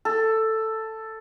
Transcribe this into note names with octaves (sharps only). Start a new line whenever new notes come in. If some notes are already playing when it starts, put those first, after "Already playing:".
A4